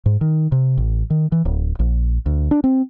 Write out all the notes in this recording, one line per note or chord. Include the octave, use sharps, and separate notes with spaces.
G#2
D#3
C3
A1
D#3
E3
D1
A#1
D2
D4
C4